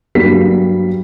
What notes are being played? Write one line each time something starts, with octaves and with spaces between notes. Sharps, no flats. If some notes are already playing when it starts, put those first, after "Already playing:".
G2 F#3 G3 A#3 B6